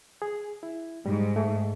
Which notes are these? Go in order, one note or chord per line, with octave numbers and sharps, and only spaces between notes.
G#4
E4
G#2 G3
A3 G#4